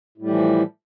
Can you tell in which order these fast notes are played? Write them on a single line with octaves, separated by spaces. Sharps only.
A2 G3 E3 F3